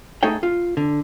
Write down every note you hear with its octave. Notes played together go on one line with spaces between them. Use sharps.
A3 D#4 G#4 A4 C#5 G5
F4
D3